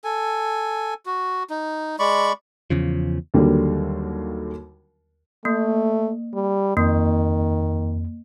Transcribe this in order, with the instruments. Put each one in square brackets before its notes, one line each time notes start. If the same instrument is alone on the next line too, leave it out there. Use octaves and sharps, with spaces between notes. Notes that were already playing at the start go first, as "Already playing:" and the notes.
[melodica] A4 G#5
F#4
D#4
G#3 D5 B5 C#6
[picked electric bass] E2 C#3 F3
[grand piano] D#2 D3 F#3 G3 A#3
[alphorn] A3 [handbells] A#3
[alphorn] G3
[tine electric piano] F2 [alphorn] D#3 [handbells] A#3